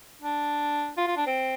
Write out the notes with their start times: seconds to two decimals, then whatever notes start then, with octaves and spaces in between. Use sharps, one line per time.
0.22 D4
0.97 F4
1.07 F4
1.17 D4
1.27 C4